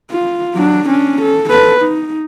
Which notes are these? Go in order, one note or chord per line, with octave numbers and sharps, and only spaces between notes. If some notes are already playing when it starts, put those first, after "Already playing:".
F4
F#3 D4
C#4 D4
A4
A4 B4
D#4